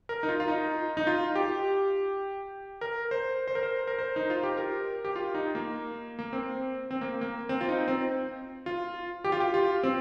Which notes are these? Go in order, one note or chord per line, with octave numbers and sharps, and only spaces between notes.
A#4
D#4
F4
F4
D#4
D#4
F4
G4
A#4
C5
C5
A#4
C5
A#4
C5
D#4
F4
G4
A#4
G4
F4
D#4
A#3
A#3
C4
C4
A#3
A#3
C4
F4
D#4
C4
F4
G4
F4
G4
F4
C4